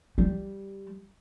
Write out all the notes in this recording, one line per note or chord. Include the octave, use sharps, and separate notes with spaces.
G3